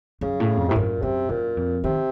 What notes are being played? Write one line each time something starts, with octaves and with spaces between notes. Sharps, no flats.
F#2 C#3
A2
F2
A2 C3
F#2 A#2
F#2 C3
F#2 A#2
F2
C3 D#3